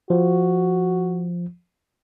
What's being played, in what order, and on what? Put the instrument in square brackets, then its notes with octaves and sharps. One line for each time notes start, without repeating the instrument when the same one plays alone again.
[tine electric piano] F3 [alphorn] F#4